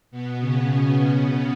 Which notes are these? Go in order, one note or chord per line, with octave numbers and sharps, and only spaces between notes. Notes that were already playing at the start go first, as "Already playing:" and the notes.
B2 B3
C#3 C#4